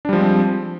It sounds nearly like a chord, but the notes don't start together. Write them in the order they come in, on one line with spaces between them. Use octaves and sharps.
D4 G3 F3 G#3 C4